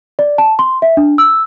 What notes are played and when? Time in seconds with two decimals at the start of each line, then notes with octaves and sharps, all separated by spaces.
0.19 D5
0.38 A5
0.59 C6
0.82 E5
0.97 D4
1.18 E6